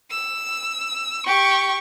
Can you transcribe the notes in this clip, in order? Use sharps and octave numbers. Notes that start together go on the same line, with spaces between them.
E6
G4 C#6